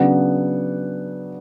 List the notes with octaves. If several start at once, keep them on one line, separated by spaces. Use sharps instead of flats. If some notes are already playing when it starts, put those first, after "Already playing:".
Already playing: C#3 F#3 B3 D4 F#5